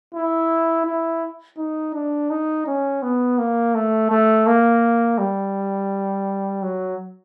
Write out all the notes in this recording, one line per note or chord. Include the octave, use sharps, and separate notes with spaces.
E4
E4
D#4
D4
D#4
C#4
B3
A#3
A3
A3
A#3
G3
F#3